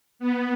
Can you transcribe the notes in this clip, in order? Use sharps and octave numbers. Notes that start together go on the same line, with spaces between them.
B3